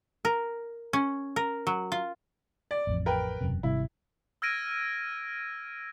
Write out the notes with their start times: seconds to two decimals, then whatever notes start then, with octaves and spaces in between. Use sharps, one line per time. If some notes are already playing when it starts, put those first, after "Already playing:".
0.25 A#4
0.93 C#4
1.36 A#4
1.67 F#3
1.92 F4
2.71 D5
2.87 A1 F2
3.06 A#4 B4 G5
3.41 E1 F#2 C3
3.63 G#1 C3 G3 E4
4.42 E6 F6 G#6 A#6 D7 D#7